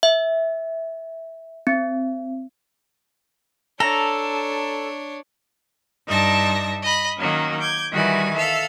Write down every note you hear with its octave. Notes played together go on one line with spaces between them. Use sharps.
E5
C4
D4 A4 C#5 A#5
G2 D#4 D5 E5 A5 A#6
D#5 B5
D#3 F#3 A#3 C#4
D6 G6 G#6
D#3 E3 G3 F#4 G#5
A4 E5 F5 E6